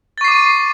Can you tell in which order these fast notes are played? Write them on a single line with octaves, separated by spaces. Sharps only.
A6 C#6 C7 D6 D#7